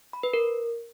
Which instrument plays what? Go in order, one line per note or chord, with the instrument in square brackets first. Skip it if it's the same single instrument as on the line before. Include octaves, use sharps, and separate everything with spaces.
[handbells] B5
B4
A#4